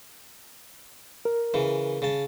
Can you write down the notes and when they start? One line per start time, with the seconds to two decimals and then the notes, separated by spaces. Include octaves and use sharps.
1.25 A#4
1.54 C#3 E3
2.02 C#3 A5